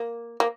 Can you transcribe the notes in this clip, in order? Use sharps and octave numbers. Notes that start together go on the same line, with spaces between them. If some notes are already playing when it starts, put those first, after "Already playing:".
Already playing: A#3
A#3